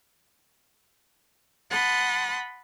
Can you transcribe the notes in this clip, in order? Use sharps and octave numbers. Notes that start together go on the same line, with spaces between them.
F#5 A5 B5 C6 D#6